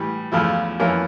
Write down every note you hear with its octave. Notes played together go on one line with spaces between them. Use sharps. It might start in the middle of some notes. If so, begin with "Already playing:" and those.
Already playing: A2 E3 G3
E2 C#3 F3 A3 E4
F2 E3 A#3 C#4 E4